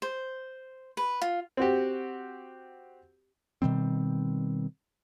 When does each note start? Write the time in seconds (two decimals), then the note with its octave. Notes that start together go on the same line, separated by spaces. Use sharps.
0.02 C5
0.97 B4
1.22 F4
1.57 C4 F#4 G4
3.62 B2 D#3 G3 C4